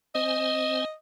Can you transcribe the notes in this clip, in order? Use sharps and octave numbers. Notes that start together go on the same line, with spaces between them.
C4 C5 D#5 G#5